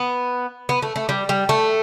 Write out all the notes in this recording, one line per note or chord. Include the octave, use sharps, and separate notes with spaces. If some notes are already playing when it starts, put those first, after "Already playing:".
Already playing: B3
B3
A3
A3
G3
G3
A3